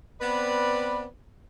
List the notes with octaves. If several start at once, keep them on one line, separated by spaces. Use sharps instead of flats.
B3 C4 B4 D5